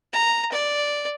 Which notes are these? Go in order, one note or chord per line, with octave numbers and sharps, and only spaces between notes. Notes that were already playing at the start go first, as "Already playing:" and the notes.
A#5
D5